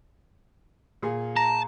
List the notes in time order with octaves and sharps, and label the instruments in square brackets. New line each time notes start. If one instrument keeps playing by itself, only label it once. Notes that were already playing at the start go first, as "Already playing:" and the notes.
[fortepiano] A#2 F4 G#4
[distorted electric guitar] A5 [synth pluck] A#5